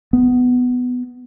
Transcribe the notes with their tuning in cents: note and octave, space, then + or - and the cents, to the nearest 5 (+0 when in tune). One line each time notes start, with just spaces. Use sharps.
B3 +10